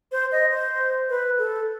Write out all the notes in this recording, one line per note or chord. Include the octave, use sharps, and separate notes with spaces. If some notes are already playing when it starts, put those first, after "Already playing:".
C5
D#5
C5
B4
A4